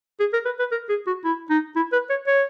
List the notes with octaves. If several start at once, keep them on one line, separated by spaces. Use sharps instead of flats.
G#4
A#4
B4
B4
A#4
G#4
F#4
E4
D#4
E4
B4
C#5
C#5